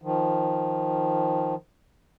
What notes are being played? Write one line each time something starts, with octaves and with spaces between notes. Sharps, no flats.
D#3 F3